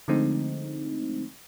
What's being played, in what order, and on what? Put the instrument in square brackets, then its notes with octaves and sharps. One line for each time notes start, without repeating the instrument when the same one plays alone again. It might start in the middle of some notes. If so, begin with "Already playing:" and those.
[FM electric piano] D3 F3 G#3 A3 C4 D#4